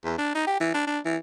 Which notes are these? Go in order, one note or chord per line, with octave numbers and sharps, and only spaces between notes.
E2
D4
D#4
G4
E3
D4
D4
E3